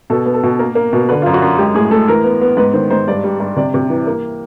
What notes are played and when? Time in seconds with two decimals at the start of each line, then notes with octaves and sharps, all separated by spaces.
0.10 B2 A4
0.26 B3
0.34 A4
0.43 B2
0.59 A#3 A#4
0.75 A#3
0.93 B2
1.09 D3 B4
1.22 F#2 F4
1.34 F#4
1.42 F#2
1.58 G#3 G4
1.74 A2 G#4
1.91 A2 A4
2.08 E3 A#4
2.24 B3
2.41 B3
2.57 G#2 B4
2.74 D#3 C5
2.90 G#2 C5
3.08 G2 D5
3.24 G3
3.40 G2
3.56 C3 D5
3.74 C3
3.90 E3
4.07 A#3